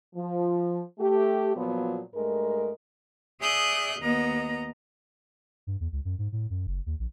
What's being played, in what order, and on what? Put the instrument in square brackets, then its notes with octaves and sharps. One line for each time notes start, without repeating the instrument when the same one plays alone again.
[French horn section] F3
A3 G4
A#2 F3 F#3 B3 F4
G2 G#3 A3 A#4
[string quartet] G#4 D5 E5 D#6 F#6 G6
D#2 B3 D#5 A#5
[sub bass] G2
E2
C#2
F#2
G#2
A2
F#2
F#1
D#2
A#1